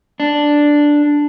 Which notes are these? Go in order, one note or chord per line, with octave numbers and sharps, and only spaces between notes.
D4